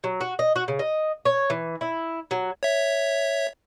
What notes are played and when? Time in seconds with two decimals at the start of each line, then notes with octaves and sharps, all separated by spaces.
0.04 F#3
0.21 F#4
0.39 D#5
0.56 F#4
0.68 C#3
0.79 D#5
1.25 C#5
1.50 E3
1.81 E4
2.31 F#3
2.63 C#5 E5